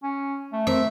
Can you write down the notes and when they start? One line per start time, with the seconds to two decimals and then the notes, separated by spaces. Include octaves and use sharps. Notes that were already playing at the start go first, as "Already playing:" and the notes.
0.03 C#4
0.52 A3
0.67 C4 A#4 E5